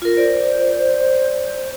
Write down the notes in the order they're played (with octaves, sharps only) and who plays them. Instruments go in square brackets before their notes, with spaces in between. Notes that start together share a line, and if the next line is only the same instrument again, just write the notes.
[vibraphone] F4 A#4
[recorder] C5 [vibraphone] D5